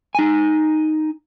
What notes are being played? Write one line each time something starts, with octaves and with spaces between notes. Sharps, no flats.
D#4 G#5